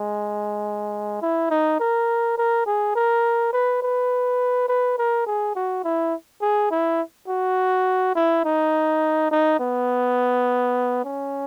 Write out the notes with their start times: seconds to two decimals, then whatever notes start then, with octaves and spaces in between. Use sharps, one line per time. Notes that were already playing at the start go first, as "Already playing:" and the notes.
Already playing: G#3
1.22 E4
1.51 D#4
1.80 A#4
2.38 A#4
2.66 G#4
2.96 A#4
3.53 B4
3.83 B4
4.68 B4
4.98 A#4
5.27 G#4
5.56 F#4
5.84 E4
6.42 G#4
6.71 E4
7.28 F#4
8.15 E4
8.44 D#4
9.31 D#4
9.60 B3
11.05 C#4